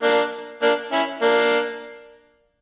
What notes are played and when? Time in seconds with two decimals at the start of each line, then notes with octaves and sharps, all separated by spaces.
0.03 A#3 D4
0.62 A#3 D4
0.92 C#4 E4
1.22 A#3 D4